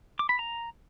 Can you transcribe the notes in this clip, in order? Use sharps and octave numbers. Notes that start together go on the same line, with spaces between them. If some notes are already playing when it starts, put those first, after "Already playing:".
D6
B5
A#5